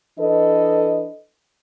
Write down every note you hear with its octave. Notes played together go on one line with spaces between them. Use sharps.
E3 D4 A4 B4 D#5